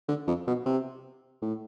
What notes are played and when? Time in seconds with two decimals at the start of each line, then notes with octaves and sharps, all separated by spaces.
0.09 D3
0.27 F2
0.47 B2
0.66 C3
1.42 A2